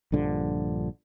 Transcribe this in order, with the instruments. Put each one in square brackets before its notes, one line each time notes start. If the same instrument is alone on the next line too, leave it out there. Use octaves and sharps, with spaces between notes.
[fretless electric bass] A#1 G2 D3 F3